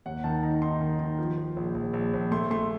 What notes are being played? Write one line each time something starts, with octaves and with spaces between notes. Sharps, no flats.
D#2 F#5
D#3 A5
D#4 A#5
D#4 C6
D#3
D#3
F3
F3
A#1
A#1
A#1
A#1
A3 C6
A3 C6